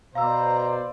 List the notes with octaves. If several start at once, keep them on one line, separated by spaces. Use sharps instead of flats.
B2 B4 C5 D5 F5 A#5 E6